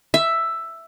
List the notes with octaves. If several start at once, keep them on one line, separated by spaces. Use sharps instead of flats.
E5